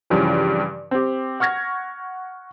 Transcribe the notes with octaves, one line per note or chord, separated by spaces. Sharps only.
G2 C#3 E3 F3
C4 G4
F#5 C#6 F6 G#6 A#6